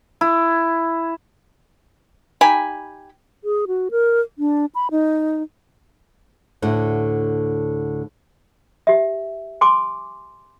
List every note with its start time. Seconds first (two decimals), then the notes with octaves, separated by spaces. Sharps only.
0.21 E4
2.41 D#4 G4 G#5 B5
3.44 G#4
3.67 F#4
3.91 A#4
4.39 D4
4.75 B5
4.91 D#4
6.62 D2 A2 D3 F#5
8.87 G4 E5
9.61 G#5 C6 D6